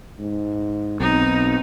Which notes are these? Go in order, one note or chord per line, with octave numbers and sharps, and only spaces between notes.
G#2
B1 C4 D#4